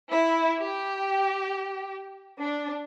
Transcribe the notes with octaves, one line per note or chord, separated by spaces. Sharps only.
E4
G4
D4